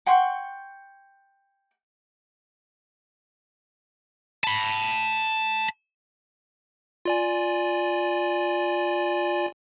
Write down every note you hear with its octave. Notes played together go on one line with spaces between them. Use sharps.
F#5 G5 C6 C#6
A5 B5
F4 D5 G#5